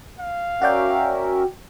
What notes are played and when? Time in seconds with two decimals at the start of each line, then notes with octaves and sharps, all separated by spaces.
0.20 F5
0.62 C#4 F#4 A#4 D5 E5 G5